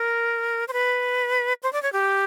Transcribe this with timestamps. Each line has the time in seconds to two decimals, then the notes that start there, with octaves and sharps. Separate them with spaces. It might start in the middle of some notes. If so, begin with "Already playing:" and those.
Already playing: A#4
0.68 C5
0.73 B4
1.63 C5
1.73 D5
1.83 C#5
1.93 G4